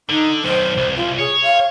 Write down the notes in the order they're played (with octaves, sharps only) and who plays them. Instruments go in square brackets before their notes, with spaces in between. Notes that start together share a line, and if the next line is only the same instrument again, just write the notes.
[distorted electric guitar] D3 [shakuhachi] D#4
[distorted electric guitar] B1 D#3 [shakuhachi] C5
[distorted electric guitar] C2
[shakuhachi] F4
[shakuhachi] G#4 [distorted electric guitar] C#5
[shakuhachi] F5